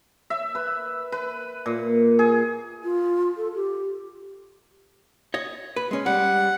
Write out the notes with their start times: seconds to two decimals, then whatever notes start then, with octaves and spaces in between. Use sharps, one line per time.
0.30 E5
0.55 B4
1.12 B4
1.66 A#2
2.19 G#4
2.84 F4
3.37 A4
3.55 G4
5.34 C#5 D#5
5.76 B4
5.91 G#3 C#4
6.06 G3 F#5